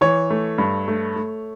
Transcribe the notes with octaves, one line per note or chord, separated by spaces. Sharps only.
E3 C#5
A3
G2
A3
A3